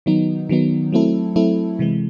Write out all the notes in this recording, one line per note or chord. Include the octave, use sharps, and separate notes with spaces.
D#3 F#3 B3 D#4
D#3 F#3 B3 D#4
F#3 A3 C4 E4 A4
F#3 A3 C4 E4 A4
C3 E3 G#3